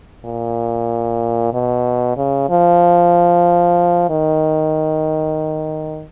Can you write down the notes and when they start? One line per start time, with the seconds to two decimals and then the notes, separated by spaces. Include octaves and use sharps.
0.25 A#2
1.53 B2
2.17 C#3
2.50 F3
4.10 D#3